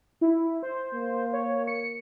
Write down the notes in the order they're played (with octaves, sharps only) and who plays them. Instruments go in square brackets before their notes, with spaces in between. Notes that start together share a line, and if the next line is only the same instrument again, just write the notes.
[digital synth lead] E4
C5
[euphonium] A#3
[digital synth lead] C#5
C#7